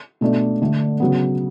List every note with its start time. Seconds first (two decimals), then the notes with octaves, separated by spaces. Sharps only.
0.21 B2 A3 D4
0.62 D3 A3 D4
1.00 C#3 F#3 B3